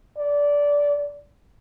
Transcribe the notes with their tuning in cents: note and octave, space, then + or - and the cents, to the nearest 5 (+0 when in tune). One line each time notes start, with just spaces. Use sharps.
D5 -15